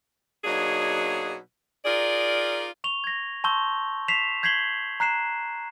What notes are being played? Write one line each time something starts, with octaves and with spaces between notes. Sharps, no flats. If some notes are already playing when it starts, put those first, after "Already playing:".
B2 F#3 A#3 D4 D#4 G#4
D#4 F4 G#4 A#4 D5
C#6 F7 G7
G#6 A#6
A5 C6 C#6 E6 G6 G7
B6 C7 E7 F7
G6 G#6 B6 C7 F#7 G7
A#5 F#6 C7 E7